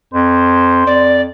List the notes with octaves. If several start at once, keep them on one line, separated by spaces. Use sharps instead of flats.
F2 C5
F2 D5